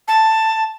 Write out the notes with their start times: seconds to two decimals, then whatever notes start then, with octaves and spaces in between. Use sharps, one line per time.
0.08 A5